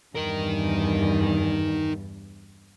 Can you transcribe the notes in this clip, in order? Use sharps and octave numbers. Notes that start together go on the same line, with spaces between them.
E2 G2 D#4 A#4